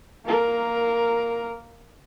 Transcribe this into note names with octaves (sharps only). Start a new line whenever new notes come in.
A#3 A#4